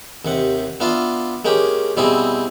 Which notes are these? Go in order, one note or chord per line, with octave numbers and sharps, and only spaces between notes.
D#2 C3 F#5
B3 D4 F4 E5 F5
G#3 A#3 C#4 G4
B2 G3 C4 E4 G#4